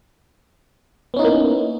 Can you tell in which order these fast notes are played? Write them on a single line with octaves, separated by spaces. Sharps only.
B3 C#4 D#4 E4 A#3